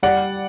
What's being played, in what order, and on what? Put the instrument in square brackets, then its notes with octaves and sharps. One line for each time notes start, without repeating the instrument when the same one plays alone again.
[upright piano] G3 D5 F#5